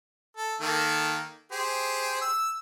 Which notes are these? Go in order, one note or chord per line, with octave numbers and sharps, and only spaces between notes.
A4
D#3 A#3 A4
G4 G#4 C5
E6